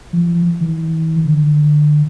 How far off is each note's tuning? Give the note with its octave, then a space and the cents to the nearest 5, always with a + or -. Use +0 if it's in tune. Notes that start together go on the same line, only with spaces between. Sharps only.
F3 -40
E3 -40
D3 +25